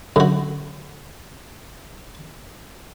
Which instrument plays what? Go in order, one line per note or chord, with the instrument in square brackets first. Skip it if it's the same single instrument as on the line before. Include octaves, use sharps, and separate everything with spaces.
[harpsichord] F#2 F#4 [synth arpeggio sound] D3